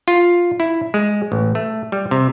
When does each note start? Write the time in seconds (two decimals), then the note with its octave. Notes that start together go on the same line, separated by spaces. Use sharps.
0.08 F4
0.60 E4
0.94 G#3
1.32 A1
1.55 A3
1.92 G3
2.11 C3